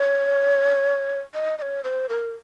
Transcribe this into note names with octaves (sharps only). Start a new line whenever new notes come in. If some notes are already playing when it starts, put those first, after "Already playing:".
Already playing: C#5
D#5
D#5
C#5
C5
A#4